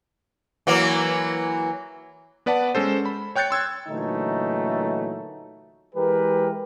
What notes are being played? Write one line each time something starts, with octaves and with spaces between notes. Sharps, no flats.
E3 F#3 A#3
B3 B4 D5 F#5 A5
G#3 C#4 A4 C5
B5
C#5 G5 F#6 G6 A6 C#7
C6 E6 G#6
A#2 D3 E3 F#3 A3 D#4
E3 G#3 G4 A#4 B4